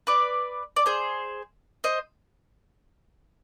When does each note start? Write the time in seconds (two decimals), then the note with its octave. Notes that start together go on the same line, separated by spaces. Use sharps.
0.07 B4 D5
0.76 D5
0.86 G#4 C5
1.84 C5 D#5